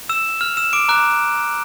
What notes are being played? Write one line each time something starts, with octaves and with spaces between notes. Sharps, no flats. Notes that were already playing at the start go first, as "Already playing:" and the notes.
E6 E7
F6 F7
E6 E7
D6 D7
A#5 D6 F#6